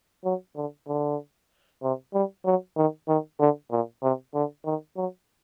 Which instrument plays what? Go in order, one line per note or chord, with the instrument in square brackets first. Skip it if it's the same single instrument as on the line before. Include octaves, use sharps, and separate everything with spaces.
[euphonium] F#3
D3
D3
C3
G3
F#3
D#3
D#3
D3
A#2
C3
D3
D#3
F#3